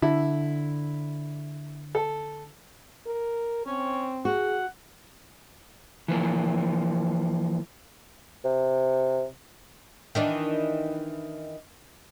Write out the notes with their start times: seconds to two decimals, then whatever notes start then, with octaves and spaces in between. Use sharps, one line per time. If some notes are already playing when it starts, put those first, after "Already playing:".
0.02 D3 E4
1.95 A4
3.07 A#4
3.66 C4 C#4
4.25 F#4 G#4 F#5
6.08 E3 F3 A#3
8.45 C3
10.15 D#3 E3 D4